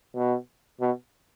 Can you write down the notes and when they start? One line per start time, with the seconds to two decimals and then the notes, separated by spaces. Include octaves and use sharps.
0.15 B2
0.80 B2